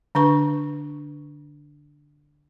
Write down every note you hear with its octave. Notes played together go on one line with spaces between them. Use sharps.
D3 D4 B4 C#6